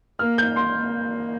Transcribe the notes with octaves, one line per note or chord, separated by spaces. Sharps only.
A#3 F6
G6
C6
A#3